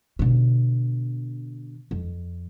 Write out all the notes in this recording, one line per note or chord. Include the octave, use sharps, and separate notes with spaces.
B2 D3
F2